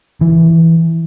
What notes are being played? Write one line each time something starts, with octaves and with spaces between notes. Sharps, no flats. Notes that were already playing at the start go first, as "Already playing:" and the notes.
E3